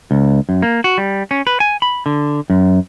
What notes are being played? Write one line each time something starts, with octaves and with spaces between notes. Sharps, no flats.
C#2
F#2
A#3
F#4
G3
C#4
B4
G#5
B5
D3
F#2